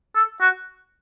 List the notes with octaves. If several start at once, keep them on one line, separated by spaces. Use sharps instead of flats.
A4
F#4